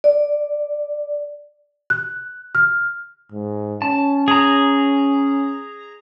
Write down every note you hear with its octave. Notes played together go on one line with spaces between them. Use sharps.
D5
F#6
F6
G#2
C#4 A5
G#4 A#5